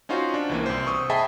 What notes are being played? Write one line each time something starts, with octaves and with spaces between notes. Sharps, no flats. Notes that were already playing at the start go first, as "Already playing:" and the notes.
C#4 D#4 F4 F#4 C5
D4
C#2 E3 A#3
C2 C5
C#6 D#6 E6
G#4 D#5 E5 G5 A5 B5